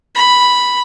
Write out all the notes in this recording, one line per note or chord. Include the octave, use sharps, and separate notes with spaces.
B5